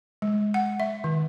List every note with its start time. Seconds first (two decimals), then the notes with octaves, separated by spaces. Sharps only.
0.22 G#3
0.54 F#5
0.80 E5
1.04 D#3